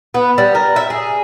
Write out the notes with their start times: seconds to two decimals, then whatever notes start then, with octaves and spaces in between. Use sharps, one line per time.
0.14 B3
0.38 G3
0.55 A#4
0.76 E5
0.90 G#4